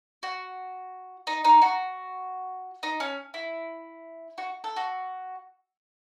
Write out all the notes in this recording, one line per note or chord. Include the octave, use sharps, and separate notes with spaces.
F#4
D#4
D#4
F#4
D#4
C#4
E4
F#4
A4
F#4